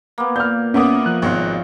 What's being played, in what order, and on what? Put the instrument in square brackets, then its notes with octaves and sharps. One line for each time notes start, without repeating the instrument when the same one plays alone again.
[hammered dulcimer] A#3 B3
[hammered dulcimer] A#2 [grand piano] F6 G6
[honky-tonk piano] A#2 A#3 B3 [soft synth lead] C#4 [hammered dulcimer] E5 [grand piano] F#5 D6 D#6
[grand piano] F3 [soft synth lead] F#6
[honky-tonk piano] G#1 B2 [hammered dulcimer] F4 F#4 C#5